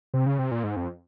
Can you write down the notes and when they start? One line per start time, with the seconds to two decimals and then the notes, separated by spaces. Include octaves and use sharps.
0.14 C3
0.26 C#3
0.39 C3
0.51 A#2
0.64 G#2
0.76 F2